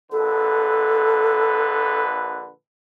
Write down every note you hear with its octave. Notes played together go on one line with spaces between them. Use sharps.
A#1 D3 A4 B4